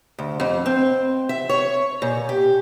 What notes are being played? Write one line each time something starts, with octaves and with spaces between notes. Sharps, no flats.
D2
F2
C4
E5
C#5
A#2
G4